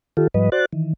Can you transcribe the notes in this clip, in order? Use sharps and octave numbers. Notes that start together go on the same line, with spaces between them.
D#3 F4 G4 A4
G#2 F3 G3 B4 D#5
F#4 C5 D5 F#6 A6
D#3 E3